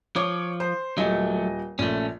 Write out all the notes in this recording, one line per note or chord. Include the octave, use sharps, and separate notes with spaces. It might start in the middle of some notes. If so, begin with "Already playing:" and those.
F3 C#5 D6
C5
D#1 F#3 A3 D#5
A#1 A3 C#4